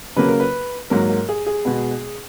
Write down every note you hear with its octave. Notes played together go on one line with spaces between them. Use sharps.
C#3 F#3 A#3 B4
A#4
B4
G#2 F#3 A#3 A#4
A#4
G#4
G#4
B2 G#3 B3